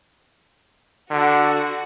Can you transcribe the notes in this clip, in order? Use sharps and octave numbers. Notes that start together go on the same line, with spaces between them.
D3 F#4